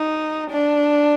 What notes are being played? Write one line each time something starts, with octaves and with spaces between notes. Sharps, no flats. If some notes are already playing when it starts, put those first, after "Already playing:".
Already playing: D#4
D4